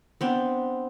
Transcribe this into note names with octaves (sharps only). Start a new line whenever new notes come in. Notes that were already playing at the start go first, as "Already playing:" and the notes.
B3 C4 D4